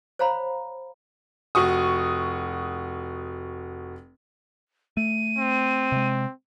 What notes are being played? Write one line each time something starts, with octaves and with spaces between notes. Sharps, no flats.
C5 C#5 F5 A#5 B5
F1 F#4 C#6 D#6
A3 D#7
C4
C3 G#3